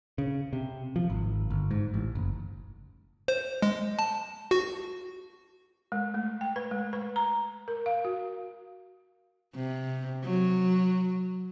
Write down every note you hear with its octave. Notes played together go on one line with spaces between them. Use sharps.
C#3
C3
F3
G#1
G1
G#2
A1
F#1
C5
G#3
A5
F#4
G#3
A3
G5
B4
G#3
B4
A#5
A#4
F5
F#4
C3
F#3